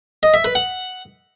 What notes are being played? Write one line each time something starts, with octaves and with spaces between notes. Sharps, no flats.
D#5
E5
B4
F#5